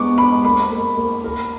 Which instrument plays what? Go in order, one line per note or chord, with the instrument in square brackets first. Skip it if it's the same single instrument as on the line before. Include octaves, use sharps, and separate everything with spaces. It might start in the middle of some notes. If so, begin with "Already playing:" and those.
Already playing: [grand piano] G#3 B3 [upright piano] C#6 D6
[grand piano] G#3 [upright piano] B5
[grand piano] A#3 [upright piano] B5
[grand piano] A#3
A#3
A#4